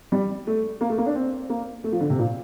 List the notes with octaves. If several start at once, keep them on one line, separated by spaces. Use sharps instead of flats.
G3
A3
A#3
A3
A#3
D4
C4
A#3
A3
F3
D3
C3
A#2